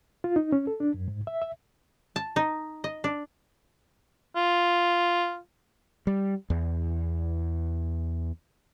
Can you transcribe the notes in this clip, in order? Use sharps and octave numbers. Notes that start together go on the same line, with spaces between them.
F4
D#4
C#4
A4
D4
F#2
G#2
E5
E5
A5
D#4
D#5
D4
F4
G3
E2